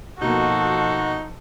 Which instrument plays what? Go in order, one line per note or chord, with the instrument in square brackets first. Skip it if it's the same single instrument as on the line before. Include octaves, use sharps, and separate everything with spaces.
[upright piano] B2 A#3 [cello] F3 A4 [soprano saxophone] D#4 [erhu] F#4